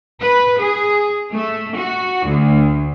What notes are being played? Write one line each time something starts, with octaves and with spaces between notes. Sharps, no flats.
B4
G#4
A3
F#4
D2